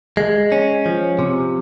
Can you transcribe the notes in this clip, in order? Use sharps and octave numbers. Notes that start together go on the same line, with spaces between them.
G#3
C#4
F3
C3